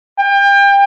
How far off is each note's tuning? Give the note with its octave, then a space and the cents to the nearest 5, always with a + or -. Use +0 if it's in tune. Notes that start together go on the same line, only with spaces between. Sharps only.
G5 +30